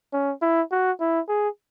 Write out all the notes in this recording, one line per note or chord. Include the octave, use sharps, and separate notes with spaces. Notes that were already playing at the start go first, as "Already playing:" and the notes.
C#4
E4
F#4
E4
G#4